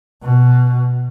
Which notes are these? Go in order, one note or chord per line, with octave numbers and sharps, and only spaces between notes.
B2